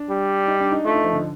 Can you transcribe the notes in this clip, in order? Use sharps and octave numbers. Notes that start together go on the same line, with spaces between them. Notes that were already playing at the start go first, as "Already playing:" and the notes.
Already playing: D4
G3
D#4
D4
D#4
A3 F4
D#4
F3
D3